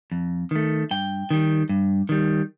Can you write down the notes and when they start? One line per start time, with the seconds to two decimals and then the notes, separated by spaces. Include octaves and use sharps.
0.12 F2
0.51 D#3 A3
0.91 G2 G5
1.31 D#3 G3
1.69 G2
2.09 D#3 G3